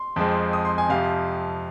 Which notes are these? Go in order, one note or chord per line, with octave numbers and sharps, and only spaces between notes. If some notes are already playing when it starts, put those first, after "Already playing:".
Already playing: C6
F2 F3 G#3 C4
D#6
C6
G#5
F2 C3 F3 F5